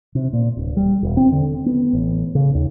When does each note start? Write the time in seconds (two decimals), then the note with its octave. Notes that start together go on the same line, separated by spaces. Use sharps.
0.15 C3
0.33 A#2
0.57 D1
0.77 G3
1.03 E1
1.17 C4
1.32 D3
1.66 B3
1.93 A1
2.35 C#3
2.55 D#2